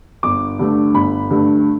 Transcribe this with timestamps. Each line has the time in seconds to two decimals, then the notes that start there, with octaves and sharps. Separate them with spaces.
0.23 G1 D6
0.59 G2 D3 A3
0.94 G1 B5
1.30 G2 D3 A3